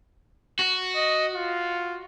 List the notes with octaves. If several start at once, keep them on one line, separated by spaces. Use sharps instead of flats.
F#4
D#5
F4